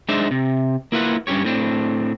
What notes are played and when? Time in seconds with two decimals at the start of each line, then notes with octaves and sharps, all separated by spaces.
0.09 G#3 D4 D#4 C5 E5
0.31 C3
0.92 A#3 E4 F4 B4 F#5
1.27 G2 A#2 C#4 G4 C#5
1.45 A2 C4 D4